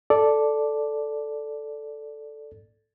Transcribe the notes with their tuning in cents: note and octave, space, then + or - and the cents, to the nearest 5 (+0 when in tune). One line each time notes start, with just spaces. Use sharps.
A4 +0 D5 +0